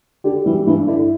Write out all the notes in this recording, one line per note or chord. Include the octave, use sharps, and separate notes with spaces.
D3 G4
E3 G3
G2 E3
D3 E4